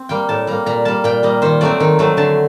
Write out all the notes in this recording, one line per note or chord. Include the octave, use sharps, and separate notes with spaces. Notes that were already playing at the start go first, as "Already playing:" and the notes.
Already playing: C4
G3 A#3 G5
A2 A5
G3 A#3 A#5
A#2 A#5
G3 A#3 A5
A#2 G5
G3 A#3 D#5
D#3 C5
F#3 A3 C4 D5
D#3
F#3 A3 C4
D3 A5